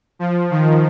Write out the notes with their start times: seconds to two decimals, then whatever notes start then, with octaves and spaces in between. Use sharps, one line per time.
0.19 F3
0.51 D#3